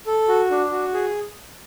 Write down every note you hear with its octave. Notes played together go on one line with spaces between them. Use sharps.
A4
F#4
D4
F#4
G#4